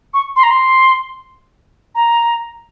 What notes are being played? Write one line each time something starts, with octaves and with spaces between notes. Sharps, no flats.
C#6
C6
A#5
C6
A#5